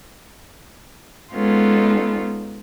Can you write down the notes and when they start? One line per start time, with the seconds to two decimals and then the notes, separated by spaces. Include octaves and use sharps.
1.34 G#3 B3 C#4 D#4 F4 A4